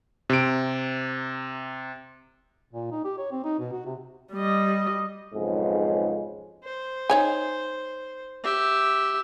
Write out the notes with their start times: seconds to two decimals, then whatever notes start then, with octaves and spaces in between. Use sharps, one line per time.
0.30 C3 D7
2.72 A#2
2.92 D#4
3.04 G4
3.18 C#5
3.32 C4
3.44 D#4
3.59 B2
3.72 F#4
3.85 C3
4.33 G3 D#5
5.35 B1 F2 G#2 C#3 G#3
6.64 C5
7.10 D#4 C#5 G#5
8.44 G4 E5